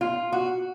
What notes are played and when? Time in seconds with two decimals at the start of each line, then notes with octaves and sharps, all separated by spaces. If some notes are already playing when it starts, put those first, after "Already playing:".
0.01 F4
0.32 F#4